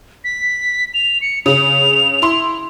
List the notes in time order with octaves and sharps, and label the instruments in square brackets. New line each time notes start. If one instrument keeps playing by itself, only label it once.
[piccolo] B6
F7
C#7
[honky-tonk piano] C#3 [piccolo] F7
[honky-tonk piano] E4 C6